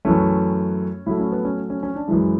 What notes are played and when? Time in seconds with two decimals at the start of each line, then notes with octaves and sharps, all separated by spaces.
0.05 F#2 E3 A3 C#4
1.06 A2 F#3 A3 E4
1.19 C#4
1.32 B3
1.45 C#4
1.70 C#4
1.83 C#4
1.95 D4
2.08 F#2 E3 G#3 E4